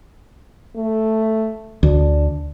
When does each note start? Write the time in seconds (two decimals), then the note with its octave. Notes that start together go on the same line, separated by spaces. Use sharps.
0.76 A3
1.83 D2 D4